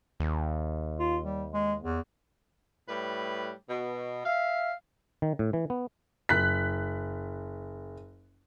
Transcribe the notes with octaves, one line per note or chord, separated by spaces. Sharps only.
D#2
F4
G3
G#3
E2
A2 G3 B4
B2
E5 F5
D#3
A2
E3
B3
F#1 F#6 B6